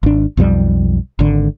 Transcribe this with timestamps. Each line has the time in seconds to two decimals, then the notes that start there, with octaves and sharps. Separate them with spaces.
0.03 G#1 D4
0.37 B1 F2 F3 G3
1.19 G#1 D3